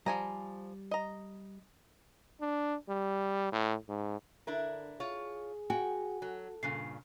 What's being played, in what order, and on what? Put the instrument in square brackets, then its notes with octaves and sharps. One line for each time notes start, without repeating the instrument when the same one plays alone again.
[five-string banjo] F3 G#5 A#5 [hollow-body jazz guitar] G3
[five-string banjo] D#5 A#5
[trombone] D4
G3
A2
G#2
[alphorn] D3 [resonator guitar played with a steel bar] D4 E4 A#4
[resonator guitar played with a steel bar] F4 C#5 [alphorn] G#4
[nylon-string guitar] F#4 [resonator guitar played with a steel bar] G5 [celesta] G#5
[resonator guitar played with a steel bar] F#3 [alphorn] A4
[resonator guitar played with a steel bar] G2 A#2 C#3 [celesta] C7